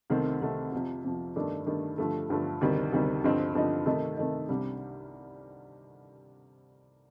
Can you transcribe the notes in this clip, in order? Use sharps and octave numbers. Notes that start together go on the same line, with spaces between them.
C2 C3 D#3 A3 C4
C2 C3 D#3 A3 C4
F2 C3 F3
F2 C3 F3
G2 D#3 A3 D4
G2 D#3 A3 D4
G2 D3 F3 A3
G2 D3 F3 A3
D2 C3 D#3 G3
D2 C3 D#3 G3
G2 D3 F3 C4 D#4
G2 D3 F3 C4 D#4
C3 D#3 A3 D#4
C3 D#3 A3 D#4
C2 C3 G3 D4